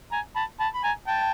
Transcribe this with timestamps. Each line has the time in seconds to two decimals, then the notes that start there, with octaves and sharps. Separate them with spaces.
0.12 G#5 A#5
0.36 A5 B5
0.60 A5 B5
0.74 B5
0.84 G#5 A#5
1.08 G5 A5